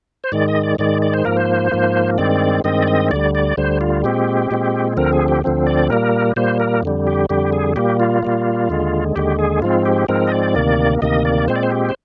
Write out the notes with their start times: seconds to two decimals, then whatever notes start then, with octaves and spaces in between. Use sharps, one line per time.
0.24 C5
0.32 G#2 D#3 G#3 D5
0.48 D#5
0.63 D5
0.78 G#2 D#3 G#3 D5
1.02 D5
1.14 C5
1.25 G#2 F3 A#3 A#4
1.37 C5
1.71 G#2 F3 A#3
2.18 G2 D#3 G#3 C4 D5
2.64 G2 D#3 G#3 C4 D#5
2.83 D5
2.88 D#5
3.11 D2 D3 G3 D5
3.35 D5
3.57 D2 D3 G3 C5
3.81 F4
4.04 A#2 G#3 C4 G4
4.51 A#2 G#3 C4
4.97 D2 D3 F3 C4 A#4
5.13 G#4
5.28 G4
5.44 D2 D3 F3 C4
5.67 D5
5.90 A#2 G3 A#3 A#4
6.36 A#2 G3 A#3 C5
6.60 A#4
6.83 F2 D3 G3
7.07 G4
7.29 F2 D3 G3 G4
7.52 G#4
7.76 A#2 G3 A#3 G4
8.00 F4
8.23 A#2 G3 A#3
8.70 D#2 D3 G#3
9.16 D#2 D3 G#3 G4
9.39 G#4
9.62 G#2 F3 G#3 C4 F4
9.85 G4
10.08 G#2 F3 G#3 C4 A#4
10.27 D#5
10.32 D5
10.55 D2 C3 D#3 A#3
11.02 D2 C3 D#3 A#3 D#5
11.25 D5
11.48 A#2 G#3 C4 C5
11.56 D5
11.63 C5
11.71 G4
11.89 C5